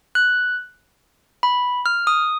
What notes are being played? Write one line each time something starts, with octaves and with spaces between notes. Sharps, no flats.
F#6
B5
F6
D#6